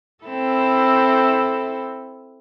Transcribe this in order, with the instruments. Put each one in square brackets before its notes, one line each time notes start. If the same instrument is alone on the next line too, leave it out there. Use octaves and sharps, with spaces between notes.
[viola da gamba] C4 E4 A4